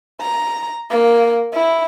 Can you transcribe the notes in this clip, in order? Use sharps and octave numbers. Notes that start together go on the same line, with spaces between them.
A#5
A#3
E4